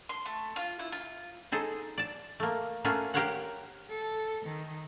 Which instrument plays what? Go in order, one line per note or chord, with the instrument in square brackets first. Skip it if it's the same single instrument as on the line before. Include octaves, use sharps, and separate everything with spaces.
[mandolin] C6
A3
F4
E4
F4
[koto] D#4 G#4 A4 C5
D5 A5
A3 A#3
A3 A#3 C#4 F4 F#4
G4 A#4 C5 C#5 F5 F#5
[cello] A4
D#3